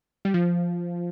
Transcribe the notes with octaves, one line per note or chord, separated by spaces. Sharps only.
G3
F3